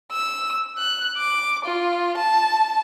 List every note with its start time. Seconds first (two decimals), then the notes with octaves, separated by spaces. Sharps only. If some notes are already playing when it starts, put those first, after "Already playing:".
0.12 E6
0.78 F#6
1.17 D6
1.65 F4
2.17 A5